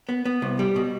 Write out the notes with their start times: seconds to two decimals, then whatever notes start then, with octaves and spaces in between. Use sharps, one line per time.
0.09 B3
0.25 B3
0.42 C2
0.59 G3
0.76 B2